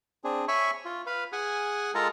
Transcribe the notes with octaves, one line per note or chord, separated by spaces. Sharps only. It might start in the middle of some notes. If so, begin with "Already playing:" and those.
C4 D4 G#4
C#5 E5 G#5 B5 C#6
F4
B4 F5
G#4 F#5 G#5
G#3 F4 A4 A#4 A5 A#5